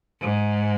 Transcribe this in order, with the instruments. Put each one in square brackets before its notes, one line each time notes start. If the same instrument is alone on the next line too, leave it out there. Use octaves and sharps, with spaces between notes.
[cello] G#2